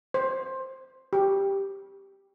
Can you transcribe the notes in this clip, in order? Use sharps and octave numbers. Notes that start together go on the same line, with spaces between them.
C5
G4